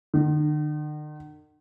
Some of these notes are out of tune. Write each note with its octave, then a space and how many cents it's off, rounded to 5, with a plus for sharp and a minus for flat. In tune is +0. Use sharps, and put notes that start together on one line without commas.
D3 +45